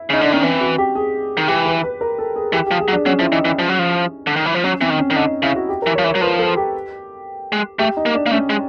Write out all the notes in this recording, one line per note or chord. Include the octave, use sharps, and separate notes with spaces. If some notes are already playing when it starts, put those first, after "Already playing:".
Already playing: E4
C#3 D#4
D3 D4
D#3 C#4
E3 C4
F#4
G4
G#4
D#3
E3 G4
B4
B4
A#4
A4
G#4
E3 G4
F3 G4
G#4
F#3
D4
F#3 C#4
F3 E4
E3 D#4
E3 C#4
F3
F#3
F3
D3
D#3
E3
F3
F#3 C#4
E3 C4
D#3
C#4
D#3
D3 D#4
C#3 E4
F#4
G4
E3 A#4
F3 C#5
E3
C#5
F#3
F3 B4
A4
G4
G#3
A3 G4
D#4
A#3
D4
A#3
A3 C#4
G#3